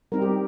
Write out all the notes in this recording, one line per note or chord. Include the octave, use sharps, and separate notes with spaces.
G3 C4 D#4 A#4
G4